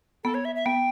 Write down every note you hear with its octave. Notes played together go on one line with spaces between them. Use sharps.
B3 A4
C#5
E5
E5
B3 G5